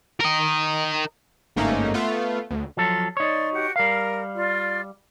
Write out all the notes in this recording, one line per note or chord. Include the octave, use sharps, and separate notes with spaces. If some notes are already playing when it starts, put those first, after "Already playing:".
A#4 D#5
G1 G#2 A3 A#3 C#4 D#4
A3 B3 F4
D2
F3 F#3 A4 C6
D#4 C#5 D5 C6
F#4 G4 F#5
G3 A#4 F5
F4 D5